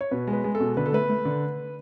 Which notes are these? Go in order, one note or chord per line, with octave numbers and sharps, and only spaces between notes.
C#5
B2 B4
G#3
B4
G#3
A4
B2
D3 B4
A4
A3 B4
A3
D3